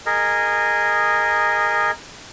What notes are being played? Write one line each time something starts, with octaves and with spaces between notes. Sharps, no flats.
G#4 A#4 D#5